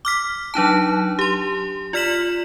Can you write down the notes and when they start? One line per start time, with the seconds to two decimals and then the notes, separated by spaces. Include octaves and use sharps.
0.05 D6 F6 B6
0.54 F#3 D4 D#4 A5
1.19 G4 C6
1.93 F4 D5 F6 B6 E7 F#7